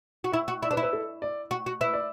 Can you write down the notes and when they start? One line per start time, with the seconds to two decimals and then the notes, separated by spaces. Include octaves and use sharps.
0.24 F#4
0.32 E4 E5
0.48 F#4
0.63 E4 D5
0.71 D4 B4
0.77 E4
0.83 B4
0.93 A4
1.22 D5
1.51 F#4
1.66 F#4
1.81 E4 B4
1.93 D5